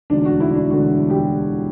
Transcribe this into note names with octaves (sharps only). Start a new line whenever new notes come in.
E1 D2 D3 D4
F#4
E4
D4
E1 D2 D3 F#4
G4